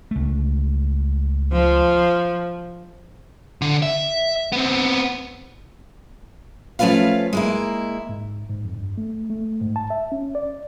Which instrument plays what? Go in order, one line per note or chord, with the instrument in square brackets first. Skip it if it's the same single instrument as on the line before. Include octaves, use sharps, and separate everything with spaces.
[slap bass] C#2 A3
[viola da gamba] F3
[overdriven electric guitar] D3
E5
B3 C4
[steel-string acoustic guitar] F3 A3 C#4 F4 B4 F5
G#3 A#3 E4
[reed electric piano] G#2
G#2
F2
G2
A3
A3
G#2
A5
E5
C#4
D5